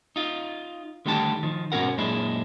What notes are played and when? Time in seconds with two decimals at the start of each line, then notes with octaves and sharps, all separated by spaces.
0.16 D#4 F4
1.06 D3 D#3 G3 A3 G4 A5
1.43 D#3 F3
1.72 G#2 B2 C#4 F#4 A#4 F#5
1.98 F#2 A#2 G#3 D4 E4